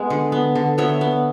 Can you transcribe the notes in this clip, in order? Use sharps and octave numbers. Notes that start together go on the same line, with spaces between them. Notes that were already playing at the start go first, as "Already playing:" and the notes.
Already playing: G#3 B3
D3
B3
D3
B3 C#5 E5
B3